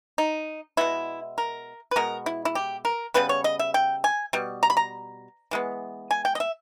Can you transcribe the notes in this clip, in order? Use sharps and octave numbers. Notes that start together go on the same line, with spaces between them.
D#4
B2 G#3 B3 E4
A#4
B4
B2 G#3 B3 A#4
E4
E4
G4
A#4
C#3 G3 B3 B4
C#5
D#5
E5
G5
G#5
B2 G3
A#5
B5
A#5
E3 G#3 B3
G#5
G5
D#5
E5